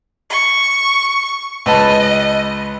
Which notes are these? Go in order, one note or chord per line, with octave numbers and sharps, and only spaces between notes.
C#6
C#2 B4 D#5 A5